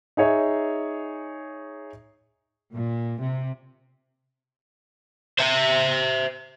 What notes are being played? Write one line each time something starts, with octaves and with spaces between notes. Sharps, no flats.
D#4 G#4 C#5 E5
A#2
C3
C5 E5